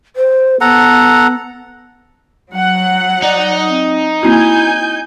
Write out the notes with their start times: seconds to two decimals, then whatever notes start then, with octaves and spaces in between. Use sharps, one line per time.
0.16 C5
0.61 B3 A4 F#5 A#5
2.51 F#3 F#5
3.22 D#4 D5
3.68 C4
4.23 A#3 C4 E4 F#4 G#5 G6